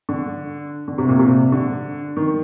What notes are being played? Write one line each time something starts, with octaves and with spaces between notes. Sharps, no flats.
D3
D3
C3
A#2
C3
D3
D#3